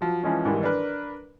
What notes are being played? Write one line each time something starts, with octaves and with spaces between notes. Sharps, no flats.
F3 F#3
E3 F3 G#3 C#4
G#2 D#3 E3 G3
D4 A#4 B4